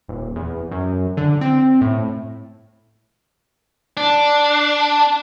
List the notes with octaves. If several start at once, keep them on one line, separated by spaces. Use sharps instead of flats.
D#1
E2
F#2
D3
C4
A2
D4